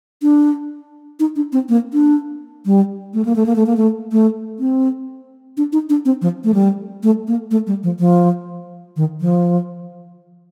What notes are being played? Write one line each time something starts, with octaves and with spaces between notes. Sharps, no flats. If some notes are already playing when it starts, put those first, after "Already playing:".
D4
D#4
D4
C4
A#3
D4
G3
A3
A#3
A3
A#3
A3
A#3
A3
A3
C4
D4
D#4
D4
C4
F3
A3
G3
A3
A#3
A3
G3
F3
F3
D#3
F3